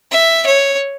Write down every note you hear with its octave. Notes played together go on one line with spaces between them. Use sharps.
E5
C#5